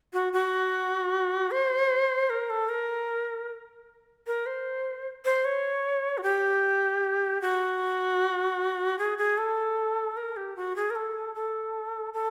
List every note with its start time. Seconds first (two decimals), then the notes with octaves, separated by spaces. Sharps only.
0.13 F#4
0.33 F#4
1.51 C5
2.30 A#4
2.50 A4
2.69 A#4
4.27 A#4
4.46 C5
5.25 C5
5.45 C#5
6.18 F#4
6.23 G4
7.42 F#4
8.99 G#4
9.18 G#4
9.38 A4
10.17 A#4
10.36 G4
10.56 F#4
10.76 G#4
10.90 A#4
10.95 A4
11.35 A4
12.14 A4